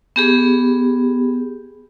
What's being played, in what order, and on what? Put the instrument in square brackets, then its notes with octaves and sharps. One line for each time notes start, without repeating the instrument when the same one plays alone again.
[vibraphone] B3 G4 G#4